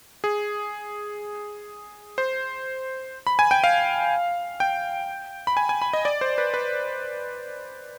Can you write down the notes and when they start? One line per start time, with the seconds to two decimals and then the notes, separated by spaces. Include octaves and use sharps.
0.24 G#4
2.18 C5
3.27 B5
3.39 G#5
3.51 G5
3.64 F5
4.60 G5
5.47 B5
5.57 G#5
5.69 G#5
5.82 B5
5.93 D#5
6.05 D5
6.21 C5
6.38 B4
6.54 B4